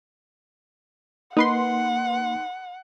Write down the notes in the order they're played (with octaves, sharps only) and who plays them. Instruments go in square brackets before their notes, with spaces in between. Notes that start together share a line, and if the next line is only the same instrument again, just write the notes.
[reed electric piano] A#3 [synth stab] D#4 B4 C6 [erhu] F#5